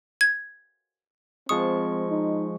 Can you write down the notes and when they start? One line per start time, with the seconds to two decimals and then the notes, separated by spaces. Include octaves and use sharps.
0.21 G#6
1.49 F3 G#3 C4 C#6 D#6
2.10 D#4